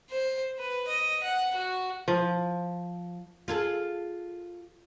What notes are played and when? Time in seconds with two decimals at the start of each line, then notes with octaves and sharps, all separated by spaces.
0.10 C5
0.58 B4
0.88 D#5
1.23 F#5
1.55 F#4
2.08 F3
3.48 F4 G#4 A4